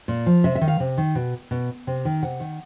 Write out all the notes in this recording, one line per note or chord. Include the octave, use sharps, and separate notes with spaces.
A#2
F3
C3 E5
E5
D#3
F5
C3
D#3
B2
B2
C3
D#3
C3 F#5
D#3